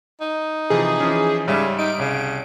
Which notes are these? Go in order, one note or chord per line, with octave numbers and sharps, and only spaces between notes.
D#4
C3 E3 F3 G#4
E3 F3 C#4
G#2 C#3 G3 E5
D#4 D7
C2 C#3